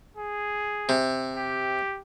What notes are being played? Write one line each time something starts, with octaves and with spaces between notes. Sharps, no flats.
G#4
C3
G4